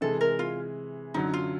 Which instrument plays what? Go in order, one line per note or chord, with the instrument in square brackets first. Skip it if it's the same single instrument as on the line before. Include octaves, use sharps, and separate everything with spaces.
[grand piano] C3 E3 G#3 [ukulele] A4
[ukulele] A#4
F4
[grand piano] F#2 D3 F#3 [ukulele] D#4
[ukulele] F4